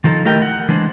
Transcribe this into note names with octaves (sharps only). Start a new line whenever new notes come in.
D#3 F3 D#4 A4
A3 E4 G4 A#4 D#5 G5
F#5
E3 G#3 D4 C5